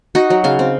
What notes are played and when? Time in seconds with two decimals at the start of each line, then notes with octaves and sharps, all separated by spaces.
0.15 D#4 F#4
0.30 F#3
0.44 C#3 F5
0.59 C4